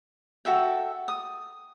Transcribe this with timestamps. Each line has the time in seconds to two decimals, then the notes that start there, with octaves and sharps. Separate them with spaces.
0.45 F#4 A4 E5 G5
1.08 D#6